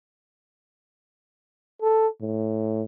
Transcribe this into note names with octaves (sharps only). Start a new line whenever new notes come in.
A4
A2